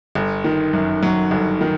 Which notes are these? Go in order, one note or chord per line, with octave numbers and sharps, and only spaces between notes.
G1
D#3
F#2
F#3
G1
D#3